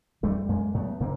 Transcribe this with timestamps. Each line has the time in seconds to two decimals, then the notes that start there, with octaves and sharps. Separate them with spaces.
0.23 F#2 G3 A3
0.49 F#2 G#3 A#3
0.74 F#2 A3 B3
1.01 C#3 A#3 C4